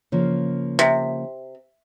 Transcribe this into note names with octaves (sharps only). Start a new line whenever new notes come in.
C#3 F3 A#3
C3